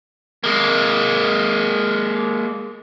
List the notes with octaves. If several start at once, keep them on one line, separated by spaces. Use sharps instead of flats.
G#3 A#3